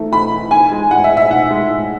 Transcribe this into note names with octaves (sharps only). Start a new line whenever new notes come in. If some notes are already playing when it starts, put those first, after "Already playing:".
Already playing: E3 A3 D#4
E3 B5
E3
D#4 G#5
G#3
A2 F#5
E5
A2
E5
D#4 F#5
G#3
A2